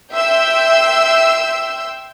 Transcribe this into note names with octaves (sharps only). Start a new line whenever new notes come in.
E5 G5 C6 E6 G6